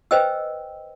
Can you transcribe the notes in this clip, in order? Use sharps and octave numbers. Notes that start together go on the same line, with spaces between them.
B4 C5 D#5 G5 G#5 E6